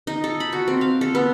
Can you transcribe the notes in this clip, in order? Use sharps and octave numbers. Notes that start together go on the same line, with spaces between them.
D#4
A4
B5
F#4
C4
F5
A4
B3